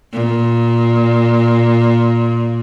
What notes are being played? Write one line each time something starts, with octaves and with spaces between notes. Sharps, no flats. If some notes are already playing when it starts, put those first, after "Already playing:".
A#2